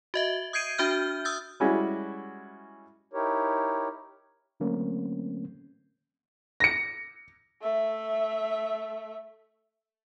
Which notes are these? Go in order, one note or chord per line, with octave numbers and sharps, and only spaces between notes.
F#4 D#5 E5
D#6 G6 G#6 C7 D7 D#7
D4 F#4 E5 F6 G6
D#6 E6 G6 A6
G3 G#3 C#4 E4 F#4
D#4 E4 G4 A#4 C#5
D3 F#3 A3 A#3 C4 C#4
A#6 C#7
A3 E5